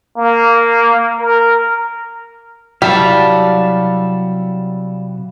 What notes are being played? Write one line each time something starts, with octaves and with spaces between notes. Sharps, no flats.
A#3
A#4
C3 F#3 G3 E4 F#4 F5 A5